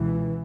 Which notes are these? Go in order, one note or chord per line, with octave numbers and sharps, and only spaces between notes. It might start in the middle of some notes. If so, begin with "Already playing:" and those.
Already playing: C#2 B2 E3